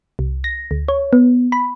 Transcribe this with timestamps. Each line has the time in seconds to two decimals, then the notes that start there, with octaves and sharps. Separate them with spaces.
0.19 C2
0.44 A#6
0.71 D2
0.88 C#5
1.13 B3
1.52 B5